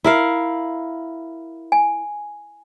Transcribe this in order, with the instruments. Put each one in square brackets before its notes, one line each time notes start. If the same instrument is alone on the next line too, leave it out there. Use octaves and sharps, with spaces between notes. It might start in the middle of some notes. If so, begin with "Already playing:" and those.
[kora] E4 A#4 F5
[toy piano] G#5